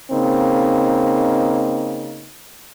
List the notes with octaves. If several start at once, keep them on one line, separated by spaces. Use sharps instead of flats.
C#3 A#3 C4 D#4